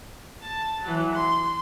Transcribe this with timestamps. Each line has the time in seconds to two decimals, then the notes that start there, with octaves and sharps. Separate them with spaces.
0.41 A5
0.83 E3 F#3
1.14 C6